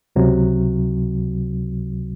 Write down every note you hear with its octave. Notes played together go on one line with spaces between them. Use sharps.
C#2 C3 F#3